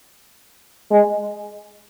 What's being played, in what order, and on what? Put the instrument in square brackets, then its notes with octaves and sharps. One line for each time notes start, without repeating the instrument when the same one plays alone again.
[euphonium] G#3